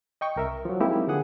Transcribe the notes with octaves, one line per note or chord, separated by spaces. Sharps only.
D#5 G5 C#6
C2 A#4 E5
F3 F#3
G#3 A#3 C4 D#4 E4 G4
D3 F3 G#4 F#5 D#6